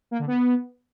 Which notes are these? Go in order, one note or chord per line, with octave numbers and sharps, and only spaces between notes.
A#3
D3
B3